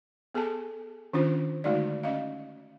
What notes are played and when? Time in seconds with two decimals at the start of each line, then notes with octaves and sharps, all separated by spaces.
0.34 B3 G#4 A4 G#5 A5
1.13 D#3 C#4 D4 F4 C5
1.64 D3 G#3 A3 D#4 F#4 D5
2.03 C#4 D#5 F5